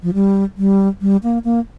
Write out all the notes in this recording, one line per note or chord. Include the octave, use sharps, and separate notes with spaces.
F3
G3
G3
G3
A#3
A#3